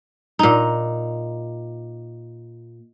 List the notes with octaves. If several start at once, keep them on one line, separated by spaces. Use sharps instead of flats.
A#2 D#4